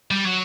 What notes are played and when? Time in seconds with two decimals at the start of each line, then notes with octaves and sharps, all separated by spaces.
0.11 G3
0.25 F#3